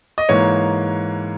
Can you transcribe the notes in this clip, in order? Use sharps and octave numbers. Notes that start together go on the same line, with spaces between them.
D#5
G#2 E3 A#3 C#5